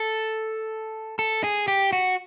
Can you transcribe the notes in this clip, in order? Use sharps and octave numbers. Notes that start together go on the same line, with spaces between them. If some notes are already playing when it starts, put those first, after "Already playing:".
Already playing: A4
A4
G#4
G4
F#4